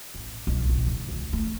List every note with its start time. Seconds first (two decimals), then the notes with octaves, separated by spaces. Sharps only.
0.14 A1
0.47 B1
0.69 A1
0.86 D3
1.09 D2
1.33 A3